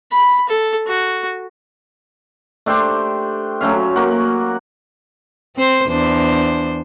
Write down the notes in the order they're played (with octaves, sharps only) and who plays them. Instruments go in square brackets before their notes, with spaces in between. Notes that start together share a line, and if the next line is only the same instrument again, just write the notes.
[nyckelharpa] B5
A4
F#4
[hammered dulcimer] A3 D4 G4 C5
F#3 A3 C#4 F5
A#3 F#4
[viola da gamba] C4 C5
E2 D4 C5